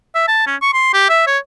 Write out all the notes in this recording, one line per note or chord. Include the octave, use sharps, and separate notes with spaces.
E5
A5
C#4
C#6
C6
G4
E5
C#5